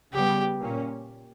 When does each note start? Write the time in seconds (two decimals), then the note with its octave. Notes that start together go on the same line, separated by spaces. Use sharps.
0.13 C#3 G3 B3 G4
0.61 A#2 A#3 C#4